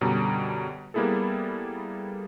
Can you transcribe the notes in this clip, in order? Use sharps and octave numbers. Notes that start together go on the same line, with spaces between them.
F#2 B2 D3 G3 A#5
G3 A#3 B3 E4 G#4 A4